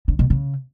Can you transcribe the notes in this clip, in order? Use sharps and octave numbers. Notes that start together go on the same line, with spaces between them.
D3
B2
C#3